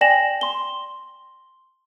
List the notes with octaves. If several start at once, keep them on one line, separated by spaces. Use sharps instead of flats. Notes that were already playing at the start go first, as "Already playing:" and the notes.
D5 G5 G#5 A#6 E7 F#7
C6 G7